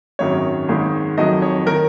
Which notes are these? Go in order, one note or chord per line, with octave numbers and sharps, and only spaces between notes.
G#1 F#2 D#3 F#3 C#5
G#1 G#2 D#3
F2 D#3 F#3 D#5
C#5
D#3 A#4